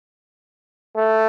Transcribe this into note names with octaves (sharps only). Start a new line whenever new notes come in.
A3